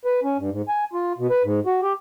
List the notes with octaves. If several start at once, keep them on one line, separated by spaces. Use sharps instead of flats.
B4
C#4
G2
G#2
G#5
F4
B2
B4
G#2
F#4
G4